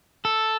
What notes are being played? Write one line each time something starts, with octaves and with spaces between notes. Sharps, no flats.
A4